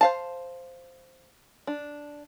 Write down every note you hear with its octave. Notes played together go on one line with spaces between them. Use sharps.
C5 F5 A5
D4